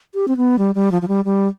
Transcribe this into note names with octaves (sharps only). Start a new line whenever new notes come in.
G4
C4
B3
G3
G3
F3
F3
G3
G3